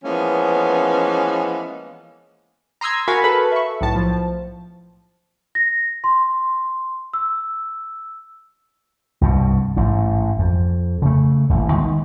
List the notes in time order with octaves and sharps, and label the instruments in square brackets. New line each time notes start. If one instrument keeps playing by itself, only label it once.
[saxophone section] E3 F3 G#3 A#3 B3 C#4
[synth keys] A#5 C6 D#6 E6 G#6
F#4 A#4 F5 G#5 B5 C#6
A4 B4
E5 C#6
B1 A2 A5
F3
[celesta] A#6
C6
E6
[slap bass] C2 G2 B2
A1 G#2
F2
C#3 A3
D#1 A1
D#3 G#3 B3